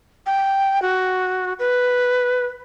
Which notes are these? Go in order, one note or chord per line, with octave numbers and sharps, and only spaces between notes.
G5
F#4
B4